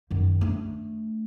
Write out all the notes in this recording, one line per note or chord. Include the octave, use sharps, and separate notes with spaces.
F#2 D#3
A3 D4